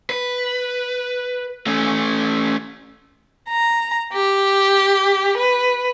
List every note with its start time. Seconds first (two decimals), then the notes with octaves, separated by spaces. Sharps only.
0.10 B4
1.67 A3 C#4
3.49 A#5
4.13 G4
5.38 B4